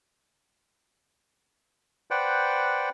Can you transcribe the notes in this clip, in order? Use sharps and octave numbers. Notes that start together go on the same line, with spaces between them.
B4 C5 D5 F#5 G5